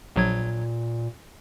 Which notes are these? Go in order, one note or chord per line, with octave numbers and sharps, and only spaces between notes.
A#1 A#2 F#3 G#6